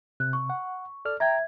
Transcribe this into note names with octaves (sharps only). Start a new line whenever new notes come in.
C3 F#6
C#6
F#5
A4 D5 F6
E5 G5 A#5 G#6